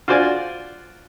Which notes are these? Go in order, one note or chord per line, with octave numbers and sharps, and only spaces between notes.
F4 F#4 C5 D5 G#5